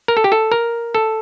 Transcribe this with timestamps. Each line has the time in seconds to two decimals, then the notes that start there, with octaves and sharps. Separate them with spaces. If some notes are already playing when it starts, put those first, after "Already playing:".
0.08 A#4
0.17 A4
0.24 G4
0.32 A4
0.52 A#4
0.94 A4